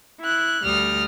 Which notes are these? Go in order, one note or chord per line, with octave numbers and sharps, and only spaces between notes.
E4 F#6
D2 G3 D#6 F6